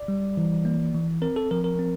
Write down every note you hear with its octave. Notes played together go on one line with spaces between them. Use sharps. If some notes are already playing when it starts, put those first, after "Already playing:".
Already playing: D5
G3
E3
A#3
E3
C4 A#4
A4
F3 A#4
A#4
C4